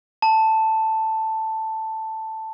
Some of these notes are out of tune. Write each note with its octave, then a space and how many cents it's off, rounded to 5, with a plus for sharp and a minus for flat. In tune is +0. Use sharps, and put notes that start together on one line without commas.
A5 +5